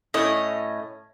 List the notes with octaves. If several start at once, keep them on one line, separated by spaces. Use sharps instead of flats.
A2 A3 C#4 D#5